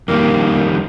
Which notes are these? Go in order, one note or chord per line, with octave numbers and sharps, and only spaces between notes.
F2 D#3 G3 A#3